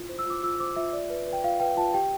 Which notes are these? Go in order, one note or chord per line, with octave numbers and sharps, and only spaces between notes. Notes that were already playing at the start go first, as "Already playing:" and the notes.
Already playing: E4 F4
C5
E6
F4 D6
F4 E6
C5 D6
F4 E5
D5
B4
B4
G5
F4 F5
B4 G5
F4 A5
G4 G5